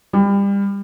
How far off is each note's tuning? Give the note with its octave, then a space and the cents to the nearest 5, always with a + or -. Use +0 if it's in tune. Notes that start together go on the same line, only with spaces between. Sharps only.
G3 +30